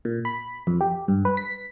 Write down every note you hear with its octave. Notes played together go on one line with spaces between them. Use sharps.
A#2
B5
F2
G4
G2
B4
B6